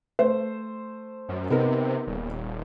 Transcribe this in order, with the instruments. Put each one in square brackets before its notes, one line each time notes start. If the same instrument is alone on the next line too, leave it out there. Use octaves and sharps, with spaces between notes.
[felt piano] A3 C5
[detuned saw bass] F#2
[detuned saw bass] C3 [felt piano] B3 D#4 A#4
[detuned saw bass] D#1